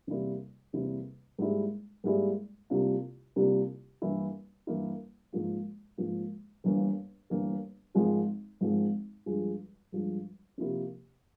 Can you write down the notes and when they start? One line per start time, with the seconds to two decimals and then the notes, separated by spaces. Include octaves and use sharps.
0.07 E2 C3 G3 A#3 E4
0.73 E2 C3 G3 A#3 E4
1.38 G#2 G3 A#3 E4 G#4
2.04 G#2 G3 A#3 E4 G#4
2.70 C2 C3 G3 A#3 F4
3.36 C2 C3 G3 A#3 F4
4.02 G2 E3 A#3 E4
4.67 G2 E3 A#3 E4
5.33 G#2 F3 A#3
5.98 G#2 F3 A#3
6.64 G1 G2 E3 A#3
7.30 G1 G2 E3 A#3
7.95 G#1 G#2 F3 G#3 C4
8.61 G#1 G#2 F3 G#3 C4
9.26 G2 F3 G#3
9.92 G2 F3 G#3
10.58 C3 F3 A#3 E4 G4